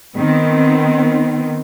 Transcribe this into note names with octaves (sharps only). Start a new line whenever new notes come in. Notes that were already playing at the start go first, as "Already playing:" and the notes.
D#3 B3 C4